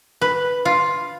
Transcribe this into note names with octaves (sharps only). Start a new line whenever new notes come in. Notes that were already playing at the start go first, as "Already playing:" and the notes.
B4
F4